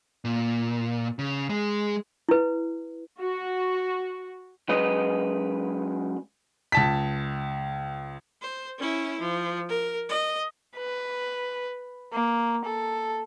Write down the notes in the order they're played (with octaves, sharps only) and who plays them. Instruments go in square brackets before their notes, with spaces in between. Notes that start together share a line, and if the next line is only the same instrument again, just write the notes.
[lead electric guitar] A#2
C#3
G#3
[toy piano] E4 B4
[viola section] F#4
[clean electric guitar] F#2 G#3 B4 D#5
[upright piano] C#2 A5 B6
[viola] C5
C#4 E4
F3
A#4
D#5
[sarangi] B4
A#3
A4